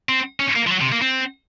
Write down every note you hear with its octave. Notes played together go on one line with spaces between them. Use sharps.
C4
C#4
A#3
F3
F#3
C3
A#3
C4